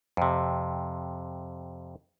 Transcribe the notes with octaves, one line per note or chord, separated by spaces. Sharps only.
F2 C3